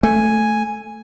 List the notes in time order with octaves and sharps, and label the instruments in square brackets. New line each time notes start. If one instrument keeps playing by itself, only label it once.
[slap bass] A3 [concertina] G#5